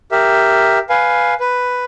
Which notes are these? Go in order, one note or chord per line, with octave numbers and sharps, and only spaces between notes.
G4 A#4 E5
B4 F5 G#5
B4